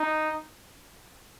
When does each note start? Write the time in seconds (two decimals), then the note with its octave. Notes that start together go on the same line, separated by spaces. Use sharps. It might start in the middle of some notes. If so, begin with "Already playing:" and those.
Already playing: D#4